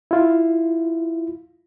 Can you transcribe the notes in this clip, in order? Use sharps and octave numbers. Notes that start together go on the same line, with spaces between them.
E4 F4